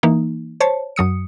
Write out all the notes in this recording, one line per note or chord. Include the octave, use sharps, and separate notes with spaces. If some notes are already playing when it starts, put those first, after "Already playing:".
E3 A#3 D#4
C5 C#5 A5
F#2 F#3 D#6 C#7